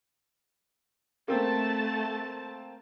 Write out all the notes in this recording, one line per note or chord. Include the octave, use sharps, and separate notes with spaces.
A3 A#3 C4 A5